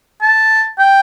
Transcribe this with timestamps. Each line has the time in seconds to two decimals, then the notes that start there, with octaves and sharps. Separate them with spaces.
0.22 A5
0.79 G5